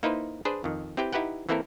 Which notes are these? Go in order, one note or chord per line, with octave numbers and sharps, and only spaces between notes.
A#3 D#4 E4 B4 C5
D4 G#4 B4 C5
F2 D#3
C4 E4 G4 B4 G5
D#4 E4 G4 B4 F#5 G5
E3 A#3 C4 E4 A4 A#4